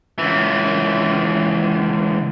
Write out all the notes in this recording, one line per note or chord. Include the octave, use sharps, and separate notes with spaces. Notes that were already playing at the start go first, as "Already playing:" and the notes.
C#2 E3